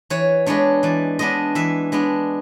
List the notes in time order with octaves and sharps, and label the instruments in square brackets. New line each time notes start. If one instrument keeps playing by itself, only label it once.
[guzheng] E3 C#5
G#3 B3 D4 C#5
E3 D5
G#3 B3 D4 D#5
E3 E5
G#3 B3 D4